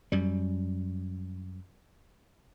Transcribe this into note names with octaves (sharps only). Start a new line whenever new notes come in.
F#2 G3